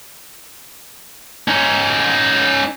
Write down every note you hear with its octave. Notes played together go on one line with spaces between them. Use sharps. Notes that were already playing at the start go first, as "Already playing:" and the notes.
C#4 D#4